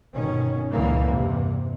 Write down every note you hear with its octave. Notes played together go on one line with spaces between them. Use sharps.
G1 B2 D#3 C#4
C#2 F#2 A#2 D3 E3 A#3
E2 G2 C3